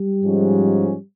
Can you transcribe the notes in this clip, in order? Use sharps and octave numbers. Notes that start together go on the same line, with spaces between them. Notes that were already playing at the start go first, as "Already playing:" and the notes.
Already playing: G3 G4
G#2 F3 G#3 C#4